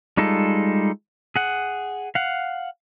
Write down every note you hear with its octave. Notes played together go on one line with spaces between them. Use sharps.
G3 G#3 D#4 F4 A4
G#4 F#5
F5 F#5